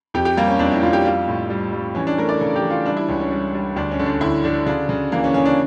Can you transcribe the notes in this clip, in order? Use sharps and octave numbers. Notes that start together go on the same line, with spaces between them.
F2 G4
G4
G3 A#3
C#4
F2 D4
E4
F2 F4
G4
G3 F4
A2
G3
G3
E3 C#4
D4
A3 A#4
D5
C#3 A4
G4
E3
F4
G3 D4
E4
C#2 C#4
C#4
G3
G3
D2 D4
C#4
D3
D4
D2 E4
D3 D4
C#3 D4
C#3
E3 A#3
C#4
C#3 C#4
D4